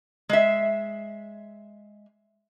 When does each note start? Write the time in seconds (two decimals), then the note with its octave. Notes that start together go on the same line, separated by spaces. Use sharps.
0.29 G#3 E5